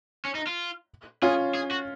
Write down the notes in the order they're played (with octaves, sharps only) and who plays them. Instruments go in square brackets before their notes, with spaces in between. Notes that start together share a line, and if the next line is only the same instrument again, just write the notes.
[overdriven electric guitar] C#4
D#4
F4
[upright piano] C#4 F4 [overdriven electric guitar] G#4
[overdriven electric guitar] G#4
F#4